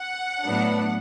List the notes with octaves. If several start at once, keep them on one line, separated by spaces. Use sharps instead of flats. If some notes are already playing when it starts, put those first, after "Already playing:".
Already playing: F#5
A2 F#3 B3 D4